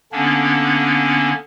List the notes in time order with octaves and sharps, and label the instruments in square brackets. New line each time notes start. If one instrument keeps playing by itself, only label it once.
[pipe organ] D3 A#3 B3 C#4 D4